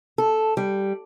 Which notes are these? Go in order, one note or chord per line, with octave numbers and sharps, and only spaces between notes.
A4
G3